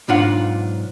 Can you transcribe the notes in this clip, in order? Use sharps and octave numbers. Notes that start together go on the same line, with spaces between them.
B1 G#2 D4 F4 F#5